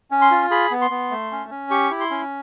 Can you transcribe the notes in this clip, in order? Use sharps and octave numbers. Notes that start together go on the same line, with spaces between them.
C#4
C6
F4
G#4 B5
B3
C6
B3
A3
C#4
C#4
G4 C#6
E4
C6
C#4